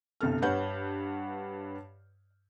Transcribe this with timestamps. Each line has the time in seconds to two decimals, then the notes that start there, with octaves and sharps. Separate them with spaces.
0.21 G1 C2 A4 F6
0.42 G2 B4 C#5 F#5 G6